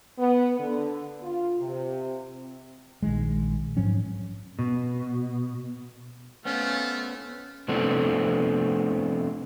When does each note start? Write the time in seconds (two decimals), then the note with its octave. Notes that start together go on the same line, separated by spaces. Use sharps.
0.18 B3
0.59 D3
1.23 F4
1.58 C3
3.03 A#1 D#3 G#3
3.77 G#2 F3 F#3 C#4
4.59 B2
6.45 A3 B3 C#4 F5
7.68 C3 F3 A3 B3 C4 D4